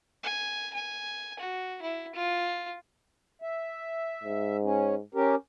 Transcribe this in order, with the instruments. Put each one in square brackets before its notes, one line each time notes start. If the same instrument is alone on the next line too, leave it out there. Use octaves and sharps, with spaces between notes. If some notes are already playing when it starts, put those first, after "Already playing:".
[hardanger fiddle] G#5
G#5
F#4
E4
F4
[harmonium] E5
[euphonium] G#2
[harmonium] C#4
C#4 G4 A#4